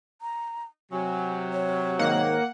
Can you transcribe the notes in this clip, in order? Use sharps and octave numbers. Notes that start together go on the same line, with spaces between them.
A#5
C3 F#3 G#5
C#5
G#2 D#3 A#3 F#5